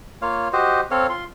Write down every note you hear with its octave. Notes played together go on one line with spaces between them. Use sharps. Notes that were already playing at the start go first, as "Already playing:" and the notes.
A#3 F4 C#5 F5
F#4 G4 C5 D#5
C4 A4 C#5 F5
F4 C6